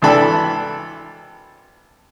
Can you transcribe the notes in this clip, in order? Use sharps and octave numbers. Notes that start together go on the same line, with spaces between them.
G#1 E3 D4 A4 B5